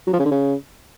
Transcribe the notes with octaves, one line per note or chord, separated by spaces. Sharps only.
F#3
F3
C#3
D3
C#3